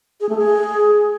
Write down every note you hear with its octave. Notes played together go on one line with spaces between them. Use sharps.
G#4
A3
G#4